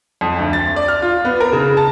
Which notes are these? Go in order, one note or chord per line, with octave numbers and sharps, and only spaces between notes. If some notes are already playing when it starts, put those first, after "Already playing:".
F2
D2
A6
D5
F6
F4
B3
A#4
C#3
A5